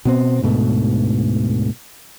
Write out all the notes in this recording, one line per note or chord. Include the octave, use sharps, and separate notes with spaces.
B2 B3 C4
D2 G#2 B2 A3